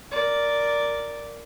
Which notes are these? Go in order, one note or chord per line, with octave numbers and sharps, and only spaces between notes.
A#4 D5